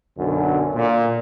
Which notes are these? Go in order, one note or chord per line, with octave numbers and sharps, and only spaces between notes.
B1 F#2 D3
A#2